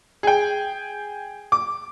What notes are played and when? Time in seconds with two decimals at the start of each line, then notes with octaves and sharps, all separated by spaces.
0.23 G#4 G5
1.52 D6